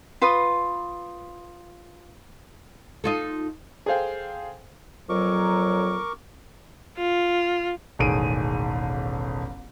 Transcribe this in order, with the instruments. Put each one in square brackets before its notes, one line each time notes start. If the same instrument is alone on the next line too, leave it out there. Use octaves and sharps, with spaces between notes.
[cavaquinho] F4 B4 C6 D#6
[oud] D#4 F4 A4
[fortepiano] G#4 A4 C5 F5 G5
[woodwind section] F2 A#2 F#3 [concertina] A#4 C#6 D6
[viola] F4
[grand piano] E1 A1 D#3 G#4 D7 D#7